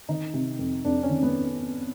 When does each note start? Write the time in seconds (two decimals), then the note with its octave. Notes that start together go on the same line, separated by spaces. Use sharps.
0.09 D#3 D#4
0.34 C3
0.59 F2
0.85 F2 D4
1.03 C#4
1.09 D#3
1.23 B3